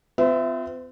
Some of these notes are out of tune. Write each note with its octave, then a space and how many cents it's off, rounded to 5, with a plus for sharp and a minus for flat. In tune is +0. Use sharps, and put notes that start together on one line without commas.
C4 -45 F4 +0 E5 +0